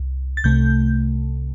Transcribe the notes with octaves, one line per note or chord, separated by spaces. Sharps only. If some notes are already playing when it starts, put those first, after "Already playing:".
Already playing: C2
A6
C2 C3 A3 G6